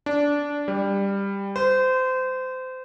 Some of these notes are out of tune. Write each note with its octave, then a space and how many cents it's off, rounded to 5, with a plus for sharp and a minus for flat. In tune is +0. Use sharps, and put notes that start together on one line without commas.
D4 -15
G3 +15
C5 -25